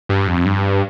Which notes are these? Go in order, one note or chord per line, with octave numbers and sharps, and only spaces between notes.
G2
F2
G2